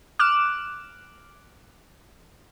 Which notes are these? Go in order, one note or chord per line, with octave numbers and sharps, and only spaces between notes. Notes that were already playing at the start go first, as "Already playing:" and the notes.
D6 F6 F#6 E7